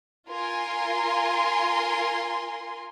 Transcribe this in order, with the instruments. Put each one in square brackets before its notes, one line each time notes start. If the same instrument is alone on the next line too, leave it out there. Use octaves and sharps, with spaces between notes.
[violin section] F4 A#4 G#5 C6